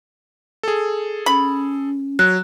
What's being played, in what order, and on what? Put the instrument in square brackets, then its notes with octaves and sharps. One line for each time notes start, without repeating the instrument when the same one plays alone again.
[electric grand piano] G#4 A4
[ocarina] C#4 [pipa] B5
[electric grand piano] F#3 [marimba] F#6